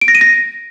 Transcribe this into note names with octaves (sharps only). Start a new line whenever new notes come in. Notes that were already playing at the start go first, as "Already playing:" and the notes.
D7
A#6
D#7
A#6